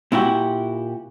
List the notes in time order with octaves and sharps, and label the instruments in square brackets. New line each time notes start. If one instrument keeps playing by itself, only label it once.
[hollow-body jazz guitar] A#2 E4 F#4 G4